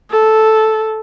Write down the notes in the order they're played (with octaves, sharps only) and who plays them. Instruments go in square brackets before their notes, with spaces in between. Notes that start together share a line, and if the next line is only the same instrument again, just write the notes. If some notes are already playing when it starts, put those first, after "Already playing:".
[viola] A4